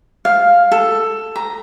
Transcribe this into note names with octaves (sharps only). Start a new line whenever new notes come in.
F5
A4
A#5